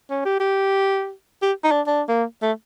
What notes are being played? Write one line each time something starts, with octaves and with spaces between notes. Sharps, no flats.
C#4
G4
G4
G4
D#4
D4
D4
A#3
A3